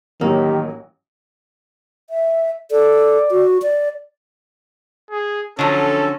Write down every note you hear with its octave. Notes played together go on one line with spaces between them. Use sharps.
A1 D#3 F#3 A#3 G4
E5
A4 D5
F#4
D5
G#4
D3 F3 F#3 C#4 A4